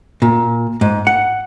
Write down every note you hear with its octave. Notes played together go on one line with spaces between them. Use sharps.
A#2
G#2
F#5